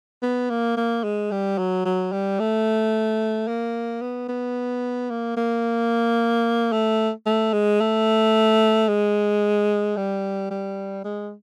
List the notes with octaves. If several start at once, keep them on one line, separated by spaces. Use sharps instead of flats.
B3
A#3
A#3
G#3
G3
F#3
F#3
G3
A3
A#3
B3
B3
A#3
A#3
A3
A3
G#3
A3
G#3
G3
G3
G#3